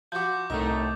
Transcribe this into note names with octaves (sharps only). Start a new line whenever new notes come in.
F3 F#4 D6 G6
C2 A2 A3 D#4 A#4